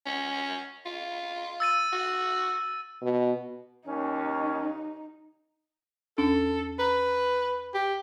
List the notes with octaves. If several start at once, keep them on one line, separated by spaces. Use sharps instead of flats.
C#4
F4
E6 A6 D#7
F#4
B2
D#2 C#4 D#4
E2 C#4 D4 A4
B4 A#5
G4